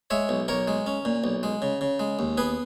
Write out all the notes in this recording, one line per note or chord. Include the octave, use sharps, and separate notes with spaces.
G#3 C#5 E5
B1
B1 A#4 C#5
G#3
C#4
A#2
B1
G#3
C#3
C#3
G#3
D#2
B3 G#4 B4